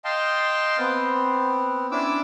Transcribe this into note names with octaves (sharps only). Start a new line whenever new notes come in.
D#5 F5 G5 A5 C6
B3 C4
C#4 D4 E4 D6 E6